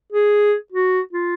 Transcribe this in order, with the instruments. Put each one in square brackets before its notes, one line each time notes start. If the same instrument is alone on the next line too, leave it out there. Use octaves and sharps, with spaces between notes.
[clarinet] G#4
F#4
F4